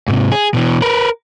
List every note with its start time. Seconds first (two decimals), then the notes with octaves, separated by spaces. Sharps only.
0.08 G#2 C3
0.32 G#4
0.54 B2 E3
0.82 A#4 B4